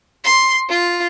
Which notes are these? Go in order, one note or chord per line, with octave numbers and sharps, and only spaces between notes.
C6
F4